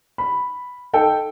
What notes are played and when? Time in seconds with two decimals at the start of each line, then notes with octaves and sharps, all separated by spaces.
0.18 B5
0.93 D#4 A4 G5